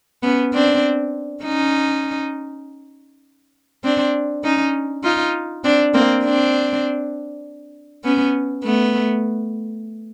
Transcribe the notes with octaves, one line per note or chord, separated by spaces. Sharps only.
B3 C#4
C4 D4
C#4 D#4
C4 D4
C#4 D#4
D#4 F4
C4 D4
A#3 C4
C4 D4
B3 C#4
A3 B3